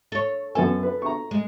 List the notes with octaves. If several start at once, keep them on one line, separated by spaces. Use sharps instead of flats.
A4 C#5
F#2 B3 A4 G#5
B4
A#5 C#6
G#3